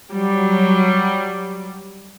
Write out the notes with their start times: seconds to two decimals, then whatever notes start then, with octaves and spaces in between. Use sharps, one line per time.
0.10 F#3 G3